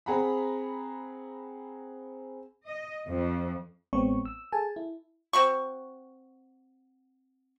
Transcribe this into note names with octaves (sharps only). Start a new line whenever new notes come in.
C4 G#4 F#5 A#5 B5
D#5
F2
A1 G#3 B3 C4 C#5 C#6
E6
G#4 A4 G#5 A5
E4
C4 F#4 C#6